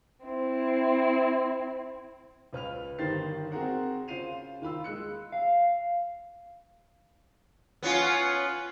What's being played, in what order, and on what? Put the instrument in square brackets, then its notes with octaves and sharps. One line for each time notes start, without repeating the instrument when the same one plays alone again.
[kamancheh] C4 E4
[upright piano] C#2 B4 F6 F7
G1 D#3 G4 C5 A6 C7
C4 F#4 G#4 A#4 F#5
C#3 F4 C5 C7 D#7 F7
D#3 F4 B5 E6
G#3 E6 F#6 C#7
[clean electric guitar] F5
[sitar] B3 C#4 F4